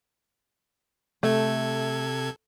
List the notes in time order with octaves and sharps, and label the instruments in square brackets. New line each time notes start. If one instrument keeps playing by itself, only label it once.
[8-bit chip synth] C3 A4 G#6 [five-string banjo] A3